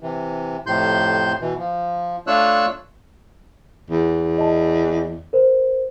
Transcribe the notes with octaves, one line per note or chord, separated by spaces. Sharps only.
C3 E3
F2 A2 C3 C6 G6
B2 E3
F3
A3 D4 F4 C#5 E6 F#6
E2
D#5 A5
A#4 C5